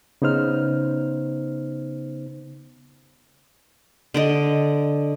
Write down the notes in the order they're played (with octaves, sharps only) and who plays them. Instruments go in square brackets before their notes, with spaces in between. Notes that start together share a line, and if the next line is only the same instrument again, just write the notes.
[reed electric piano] C#3 B3 D#4 C5 F6
[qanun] D3 D5 D#5